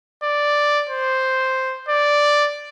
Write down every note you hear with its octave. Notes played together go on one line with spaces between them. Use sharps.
D5
C5
D5